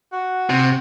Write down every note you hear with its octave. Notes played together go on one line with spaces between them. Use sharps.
F#4
C3